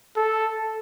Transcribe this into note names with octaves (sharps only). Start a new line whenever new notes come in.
A4